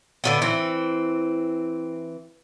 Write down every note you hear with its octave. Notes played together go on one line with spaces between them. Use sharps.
D3 F#3 B3
E3 C4